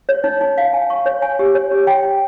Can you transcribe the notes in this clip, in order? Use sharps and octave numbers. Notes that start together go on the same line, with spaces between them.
C#5
D#4
D#4
F5
G#5
C#6
C#5
G#5
G4
C#5
G4
G5
G5